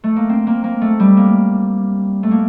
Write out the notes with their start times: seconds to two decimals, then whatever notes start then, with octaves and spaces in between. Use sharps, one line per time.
0.04 A3
0.16 A#3
0.29 C4
0.47 A#3
0.64 A#3
0.81 A3
1.00 G3
1.17 A#3
2.23 A3
2.31 A#3